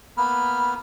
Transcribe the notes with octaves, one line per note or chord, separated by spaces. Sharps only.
A#3 B3 B5 F6